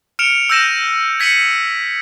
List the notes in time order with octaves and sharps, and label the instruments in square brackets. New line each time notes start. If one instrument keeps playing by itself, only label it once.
[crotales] F6 C#7 D7 E7 F7
E6 F6 G6 A#6 D#7 E7
G#6 B6 C#7 D#7 F#7